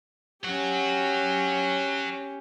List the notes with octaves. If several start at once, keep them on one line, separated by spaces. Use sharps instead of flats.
C#4 G4 C#5 F#5